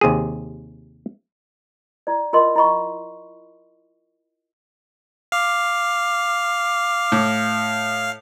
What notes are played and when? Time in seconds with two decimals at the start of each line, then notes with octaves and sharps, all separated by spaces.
0.01 D#2 C3 G4 G#4
2.07 E4 D5
2.33 F4 A#4 D#5 C6
2.56 E4 D#5 B5 C#6
5.32 F5 D6
7.12 A2